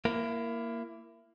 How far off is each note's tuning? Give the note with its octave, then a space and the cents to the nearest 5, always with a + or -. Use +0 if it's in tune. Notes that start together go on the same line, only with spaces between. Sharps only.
A#3 +0 E4 +25